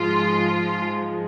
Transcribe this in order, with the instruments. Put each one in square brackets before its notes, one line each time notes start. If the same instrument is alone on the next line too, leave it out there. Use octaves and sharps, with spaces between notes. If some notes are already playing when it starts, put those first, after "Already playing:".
Already playing: [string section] G#2 F3 G#3 F4